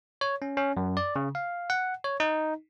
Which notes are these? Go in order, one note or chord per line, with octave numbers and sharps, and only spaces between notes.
C#5
C#4
C#4
F#2
D5
C#3
F5
F#5
C#5
D#4